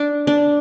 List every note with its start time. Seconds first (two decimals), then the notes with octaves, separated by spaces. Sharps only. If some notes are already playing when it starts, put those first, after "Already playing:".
Already playing: D4
0.27 D4